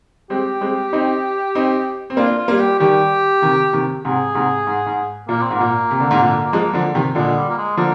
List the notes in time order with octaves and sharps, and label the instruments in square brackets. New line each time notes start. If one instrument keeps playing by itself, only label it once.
[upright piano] G#3 C4 [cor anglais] G4
[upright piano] G#3 C4
C4 D#4
C4 D#4
C4
[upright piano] A#3 D4 [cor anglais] F4
[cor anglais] F4
[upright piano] G3 A#3
[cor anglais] G4
[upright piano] D#3 G3 [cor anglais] G4
[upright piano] C3 D#3
C3 D#3
[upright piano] G#2 C3 [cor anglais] G#4
[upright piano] G#2 C3
G#2
G#2
[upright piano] A#2 [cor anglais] A#3
[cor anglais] C4
[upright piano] G#2 [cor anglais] A#3
[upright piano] A#2
C3
D3
G#2 C3
A#2 D3
F3 G#3
D3 F3
C3 D#3
[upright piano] A#2 D3 [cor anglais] G#3
[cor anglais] G3
A#3
G#3
[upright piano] D3 F3 [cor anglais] A#3